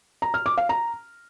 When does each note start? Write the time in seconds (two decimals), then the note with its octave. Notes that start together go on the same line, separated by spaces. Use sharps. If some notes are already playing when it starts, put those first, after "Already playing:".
0.22 A#5
0.34 F6
0.46 D6
0.58 F5
0.69 A#5